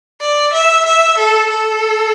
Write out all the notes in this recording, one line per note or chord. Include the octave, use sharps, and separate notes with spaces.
D5
E5
E5
A4
A4